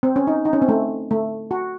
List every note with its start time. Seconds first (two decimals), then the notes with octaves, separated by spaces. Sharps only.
0.03 C4
0.16 C#4
0.27 D#4
0.45 D#4
0.53 C#4
0.62 C4
0.69 A3
1.11 A3
1.51 F#4